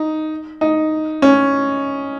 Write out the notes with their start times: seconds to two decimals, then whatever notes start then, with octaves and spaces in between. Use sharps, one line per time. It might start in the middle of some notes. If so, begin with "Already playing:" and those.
Already playing: D#4
0.61 D#4
1.22 C#4